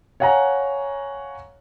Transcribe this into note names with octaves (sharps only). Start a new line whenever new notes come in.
C#5 F5 F#5 G#5 A#5